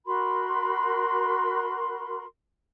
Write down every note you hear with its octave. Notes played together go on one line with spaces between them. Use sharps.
F#4 A#4 B5 C6